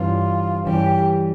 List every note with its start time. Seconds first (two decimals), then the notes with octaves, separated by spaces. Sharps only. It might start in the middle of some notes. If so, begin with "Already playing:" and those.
Already playing: G2 E3 G3 C#4 F4
0.66 G2 E3 G3 C#4 G4